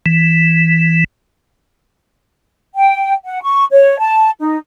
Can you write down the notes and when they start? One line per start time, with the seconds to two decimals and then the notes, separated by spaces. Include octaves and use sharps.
0.06 E3
2.75 G5
3.25 F#5
3.42 C#6
3.71 C#5
3.99 A5
4.39 D#4